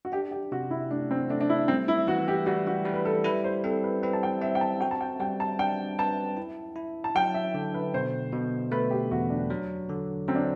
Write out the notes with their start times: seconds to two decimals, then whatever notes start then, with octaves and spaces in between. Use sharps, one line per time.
0.05 F#4
0.12 D4 G4
0.31 G4
0.52 C3 F#4
0.71 E4
0.91 A3 D4
1.11 C4
1.29 A3 D4
1.41 D4
1.50 E4
1.68 G3 C4
1.88 E4
2.07 E3 F#4
2.28 G4
2.46 G3 F#4
2.67 F#4
2.85 G3
2.94 B4
3.05 A4
3.24 E4 B4
3.44 C5
3.64 C4 A4
3.84 B4
4.02 C4 B4
4.13 A5
4.23 G5
4.41 C4 E5
4.55 G5
4.61 A5
4.81 F#4 G5
4.91 A5
5.01 G5
5.20 G3 G5
5.40 A5
5.59 D4 G5
5.99 B4 A5
6.37 E4
6.76 E4
7.04 A5
7.15 F#3 G5
7.34 E5
7.54 D3
7.74 B4
7.94 B2 C5
8.32 B2
8.72 A3 B4
8.91 G4
9.11 E2 F#4
9.30 D4
9.50 F#3
9.89 D3
10.28 F#3 C4
10.35 D4